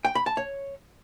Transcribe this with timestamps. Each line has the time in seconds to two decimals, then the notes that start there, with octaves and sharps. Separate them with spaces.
0.05 G5
0.15 B5
0.26 A5
0.37 C#5